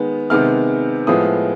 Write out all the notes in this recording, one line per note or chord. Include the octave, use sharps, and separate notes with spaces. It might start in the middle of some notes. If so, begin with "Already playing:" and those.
Already playing: D#3 G#3 B3
C3 D#3 G#3 B3 F6
A2 F3 G#3 B3 D#6